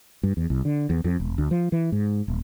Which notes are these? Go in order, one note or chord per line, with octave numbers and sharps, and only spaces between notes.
G2
E2
C2
D3
E2
F2
E1
D2
F3
E3
G#2
D#1